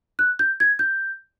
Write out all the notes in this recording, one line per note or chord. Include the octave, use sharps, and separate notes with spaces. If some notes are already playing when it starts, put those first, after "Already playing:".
F#6
G6
G#6
G6